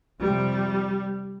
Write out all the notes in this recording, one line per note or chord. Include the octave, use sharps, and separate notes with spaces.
F2 C3 G3